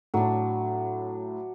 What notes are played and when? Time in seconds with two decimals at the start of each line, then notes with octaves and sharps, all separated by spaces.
0.14 A2 F#3 D4